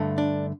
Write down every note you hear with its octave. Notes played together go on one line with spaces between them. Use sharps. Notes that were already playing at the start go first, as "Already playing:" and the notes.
Already playing: G2 D3 A3
D4